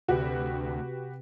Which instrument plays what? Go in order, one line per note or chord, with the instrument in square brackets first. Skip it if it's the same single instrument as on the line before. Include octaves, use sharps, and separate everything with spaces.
[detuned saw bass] D2 [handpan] C3 [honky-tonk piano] F#4 G4 B4